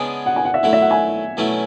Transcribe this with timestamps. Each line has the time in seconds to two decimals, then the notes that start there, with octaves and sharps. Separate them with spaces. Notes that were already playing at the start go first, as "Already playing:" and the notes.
Already playing: C#3 G#3 B3 D4 G#5
0.26 F#5
0.36 G#5
0.45 F#5
0.54 E5
0.63 F#3 A3 E4 F#5
0.73 E5
0.82 F#5
0.91 G#5
1.37 B2 F#3 A3 C#4 E4